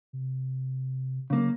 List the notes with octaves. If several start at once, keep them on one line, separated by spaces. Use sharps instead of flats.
C3
C#3 F#3 A#3